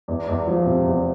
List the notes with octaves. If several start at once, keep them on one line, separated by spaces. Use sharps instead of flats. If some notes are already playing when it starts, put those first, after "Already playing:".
E2
E2
F3
C3
E2